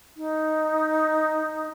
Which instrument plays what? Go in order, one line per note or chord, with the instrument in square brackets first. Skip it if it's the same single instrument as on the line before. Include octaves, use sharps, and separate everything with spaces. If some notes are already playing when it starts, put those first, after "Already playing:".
[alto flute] D#4